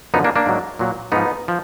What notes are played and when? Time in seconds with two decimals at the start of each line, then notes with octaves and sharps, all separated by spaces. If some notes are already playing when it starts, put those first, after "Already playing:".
0.14 F#2 D3 F3 B3 D#4
0.24 A#3 D4
0.36 A#3 D4
0.46 G#2 F#3
0.79 A#2 F#3
1.12 G#2 F3 B3 D#4
1.48 F3